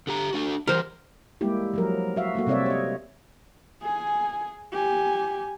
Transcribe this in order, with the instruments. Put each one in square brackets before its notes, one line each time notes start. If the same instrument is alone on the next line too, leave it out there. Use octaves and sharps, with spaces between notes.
[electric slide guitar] D3 G4 A#5
A3 D4 F#4
[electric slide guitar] E3 F3 G3 [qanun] A#4 C5
[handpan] G3 G#3 A#3 E4 G4
F3 F#3 A#4
F#4 E5 F5
A3 A#3 F#4
C3 G3 C4 C#5 D5 E5
C#5 D#5
[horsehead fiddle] G#4 G#5
G4 G#5